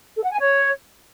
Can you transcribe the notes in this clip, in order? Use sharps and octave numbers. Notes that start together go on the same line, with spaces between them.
A4
F#5
G#5
C#5